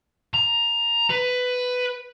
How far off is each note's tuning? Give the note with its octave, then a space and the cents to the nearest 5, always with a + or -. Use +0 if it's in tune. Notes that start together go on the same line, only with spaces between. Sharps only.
A#5 +10
B4 +10